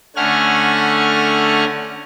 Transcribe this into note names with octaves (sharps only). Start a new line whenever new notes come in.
D3 A3 C#4 F#5 G#5 F6